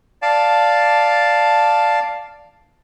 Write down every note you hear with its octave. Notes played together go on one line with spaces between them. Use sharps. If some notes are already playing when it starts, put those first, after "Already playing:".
D5 F5 A5